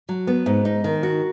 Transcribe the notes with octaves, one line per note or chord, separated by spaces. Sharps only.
F#3
B3
G#2
D#4
D#3
F#4